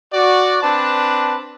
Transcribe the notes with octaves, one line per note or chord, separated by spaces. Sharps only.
F#4 D5
C4 D4 B4 A5